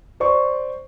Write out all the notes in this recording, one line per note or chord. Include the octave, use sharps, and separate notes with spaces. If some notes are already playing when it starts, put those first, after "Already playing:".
C5 D5 C#6